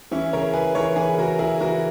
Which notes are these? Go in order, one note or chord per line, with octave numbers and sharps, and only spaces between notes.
E3 C#4 E4
C#3 A#4 C#5
C#3 G#4 B4
E3 A#4 C#5
E3 G#4 B4
C#3 F#4 A#4
C#3 E4 G#4
E3 F#4 A#4